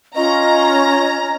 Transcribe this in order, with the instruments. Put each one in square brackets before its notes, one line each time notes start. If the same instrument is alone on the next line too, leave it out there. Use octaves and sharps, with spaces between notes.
[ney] C#4 [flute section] F4 C#6 [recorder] D#5 [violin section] A#5